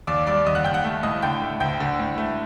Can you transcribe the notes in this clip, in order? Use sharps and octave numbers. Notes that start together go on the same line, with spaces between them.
D#2 D5 D6
G3 D5 D6
D#2 D#5 D#6
F#5 F#6
D#2 G5 G6
F#5 F#6
A3
A2 D#5 D#6
D3 G5 G6
A3
D2 G5 G6
D3
A2
A3